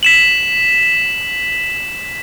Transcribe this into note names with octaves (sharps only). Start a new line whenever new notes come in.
B6 E7 F#7